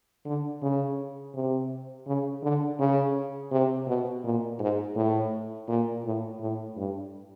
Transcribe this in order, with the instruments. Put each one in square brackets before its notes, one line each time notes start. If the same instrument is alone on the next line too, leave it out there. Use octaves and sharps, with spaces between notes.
[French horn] D3
C#3
C3
C#3
D3
C#3
C3
B2
A#2
G#2
A2
A#2
A2
A2
G2